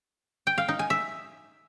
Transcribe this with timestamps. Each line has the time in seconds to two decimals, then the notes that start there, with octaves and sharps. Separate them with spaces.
0.47 G5
0.58 F5
0.68 D#4
0.79 G#5
0.90 E5